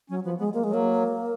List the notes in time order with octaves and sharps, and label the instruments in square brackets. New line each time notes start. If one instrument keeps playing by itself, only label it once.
[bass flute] F#3 [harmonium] C#4
[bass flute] F3 [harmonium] B3
[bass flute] G#3 [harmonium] B3
[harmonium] G#3 [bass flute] A#3
[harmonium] F#3 [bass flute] G#3
[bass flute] A#3